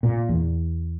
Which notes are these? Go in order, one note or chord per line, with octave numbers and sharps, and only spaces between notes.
A#2
E2